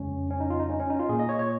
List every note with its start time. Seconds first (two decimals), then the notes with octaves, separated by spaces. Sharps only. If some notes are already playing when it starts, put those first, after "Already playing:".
Already playing: F2 C#3 G#3 C#4
0.31 C#4
0.40 D#4
0.50 F4
0.60 D#4
0.69 C#4
0.80 C#4
0.90 D#4
1.00 F4
1.09 A#2 A#3 G#4
1.19 D#5
1.29 C#5
1.39 C#5